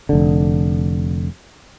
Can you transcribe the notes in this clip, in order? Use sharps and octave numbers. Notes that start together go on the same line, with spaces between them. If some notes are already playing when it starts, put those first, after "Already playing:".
F1 D3